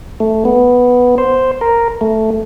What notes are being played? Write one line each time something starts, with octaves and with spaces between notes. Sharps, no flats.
A3
B3
C5
A#4
A3